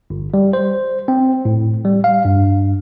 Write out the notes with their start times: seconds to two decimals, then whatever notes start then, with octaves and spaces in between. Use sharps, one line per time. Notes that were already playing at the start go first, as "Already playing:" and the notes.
0.10 G1
0.34 G3
0.53 C5
1.08 C4
1.45 A2
1.85 G3
2.04 F5
2.25 G2